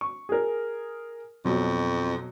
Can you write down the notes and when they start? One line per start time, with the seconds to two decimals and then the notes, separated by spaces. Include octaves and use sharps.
0.01 C#6
0.29 G#4 A#4
1.45 F2 B2 F#3